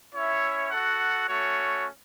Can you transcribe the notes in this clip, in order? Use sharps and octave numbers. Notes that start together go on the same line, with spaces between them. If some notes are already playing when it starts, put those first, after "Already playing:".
C#4 E4 C#5 E5
F#4 A4 F#5
A3 C#4 F#4 C#5